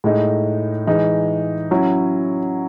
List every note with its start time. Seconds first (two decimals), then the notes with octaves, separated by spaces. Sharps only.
0.04 A2 G#3 D#4
0.87 E3 G#3 D#4
1.71 F#3 C#4 E4